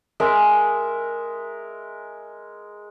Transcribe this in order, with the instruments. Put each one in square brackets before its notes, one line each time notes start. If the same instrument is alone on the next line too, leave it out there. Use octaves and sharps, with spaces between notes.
[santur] G#3 A#4 E5